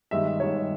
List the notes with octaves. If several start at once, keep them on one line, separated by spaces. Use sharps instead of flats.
G2 D#3 G#3 E5
G2 D#3 G#3 C#5